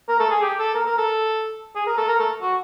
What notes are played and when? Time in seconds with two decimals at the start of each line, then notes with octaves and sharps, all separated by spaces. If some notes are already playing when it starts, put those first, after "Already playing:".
0.08 A#4
0.19 A4
0.31 G#4
0.42 G4
0.59 A4
0.74 A#4
0.86 A#4
0.97 A4
1.75 G#4
1.86 A#4
1.97 A4
2.08 A#4
2.19 A4
2.41 F#4